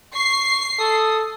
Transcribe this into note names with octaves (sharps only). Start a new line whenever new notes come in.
C#6 C7
A4 D#6